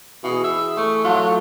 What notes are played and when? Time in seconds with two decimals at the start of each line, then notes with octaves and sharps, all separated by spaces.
0.24 B2 E3 G#4
0.44 E5
0.77 A3 C#6
1.04 F#3 A3 F4